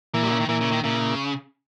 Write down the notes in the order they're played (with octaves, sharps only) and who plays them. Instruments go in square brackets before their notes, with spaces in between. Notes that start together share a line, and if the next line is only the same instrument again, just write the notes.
[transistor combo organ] A#2 A#3 E4 [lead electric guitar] E3
[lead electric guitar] G3
C#3
D#3
[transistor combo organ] A#2 A#3 E4 [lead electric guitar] E3
[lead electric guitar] C#3
D#3
[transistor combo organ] A#2 A#3 E4 [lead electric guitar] C#3